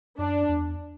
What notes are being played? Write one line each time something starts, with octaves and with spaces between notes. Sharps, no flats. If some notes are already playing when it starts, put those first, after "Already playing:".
F#2 D4
E2